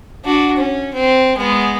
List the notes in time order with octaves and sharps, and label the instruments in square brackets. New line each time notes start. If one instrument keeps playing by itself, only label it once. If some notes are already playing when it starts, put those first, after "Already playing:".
[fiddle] D4 F#4
C#4
C4
G#3 B3